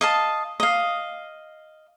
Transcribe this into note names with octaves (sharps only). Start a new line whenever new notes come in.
D#5 F5 A5
D#5 F5